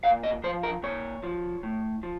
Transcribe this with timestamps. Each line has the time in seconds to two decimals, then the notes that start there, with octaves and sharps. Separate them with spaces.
0.04 A#2 F5
0.24 D#5
0.44 F3 C5
0.63 A#4
0.83 A#2 C#5
1.23 F3
1.63 A2
2.03 F3